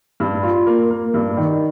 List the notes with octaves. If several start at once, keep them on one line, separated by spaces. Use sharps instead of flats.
G2
F4
A#3
A#3
G2
D#3